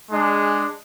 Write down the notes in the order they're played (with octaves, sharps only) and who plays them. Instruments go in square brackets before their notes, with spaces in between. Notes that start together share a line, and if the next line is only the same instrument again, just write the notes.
[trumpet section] G#3 D4 G#4